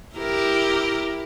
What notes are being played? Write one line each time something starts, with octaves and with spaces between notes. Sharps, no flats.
E4 G4 A#4